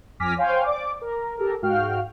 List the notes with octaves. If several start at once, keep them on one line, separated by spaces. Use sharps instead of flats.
F2 G#5 D6 F6 A#6 B6
C5 C#5 F5 G5 G#5 C6
D5 D6
A#4
G4 A4 A#4
G#2 F#4 F5 G5 F6